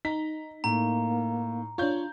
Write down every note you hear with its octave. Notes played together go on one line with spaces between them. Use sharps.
D#4 A#5 B6
A2 A#3 A#5
D4 F4 C#5 G6